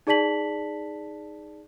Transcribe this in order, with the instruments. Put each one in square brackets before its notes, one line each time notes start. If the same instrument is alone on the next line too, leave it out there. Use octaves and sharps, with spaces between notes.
[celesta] D#4 G#4 D5 A5 B6 F#7